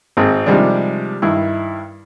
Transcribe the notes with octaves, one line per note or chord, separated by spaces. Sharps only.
G#1 C4 G#4
C3 D#3 F3 G3 G#3 D4
G2 D#3 E4